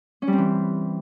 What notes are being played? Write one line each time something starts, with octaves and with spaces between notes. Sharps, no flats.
C#4
G3
C4
E3